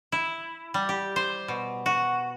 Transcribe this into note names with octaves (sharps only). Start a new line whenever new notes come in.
E4
G3
G4
C5
B2
F#4